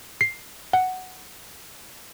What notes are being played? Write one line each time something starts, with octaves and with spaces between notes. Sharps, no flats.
C7
F#5